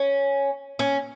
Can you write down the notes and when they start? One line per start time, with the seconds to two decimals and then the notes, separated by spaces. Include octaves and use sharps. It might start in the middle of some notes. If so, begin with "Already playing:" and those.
Already playing: C#4
0.79 C#4